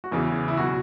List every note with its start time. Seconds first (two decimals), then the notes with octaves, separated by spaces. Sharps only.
0.04 F#4
0.11 E2 C#3 E3 E4
0.48 E4
0.57 B2 F#3 F#4